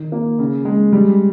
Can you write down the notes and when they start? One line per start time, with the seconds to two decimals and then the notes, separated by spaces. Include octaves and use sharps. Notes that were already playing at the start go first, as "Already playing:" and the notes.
Already playing: D#3
0.12 A#3
0.39 C#3
0.65 G#3
0.93 G3